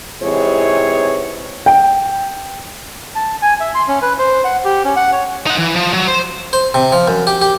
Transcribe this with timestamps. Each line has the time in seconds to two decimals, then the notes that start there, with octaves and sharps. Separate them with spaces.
0.22 G#2 C3 E3 G#4 C#5
1.66 G5
3.15 A5
3.42 G#5
3.60 E5
3.75 C6
3.88 C#4
4.02 B4
4.18 C5
4.45 F#5
4.65 G4
4.85 C#4
4.96 F#5
5.12 C#5
5.47 D#4 F#5
5.58 E3
5.76 F3
5.93 F#3
6.08 C5
6.53 C5
6.74 C3
6.92 F3
7.08 F#2
7.27 G4
7.42 G4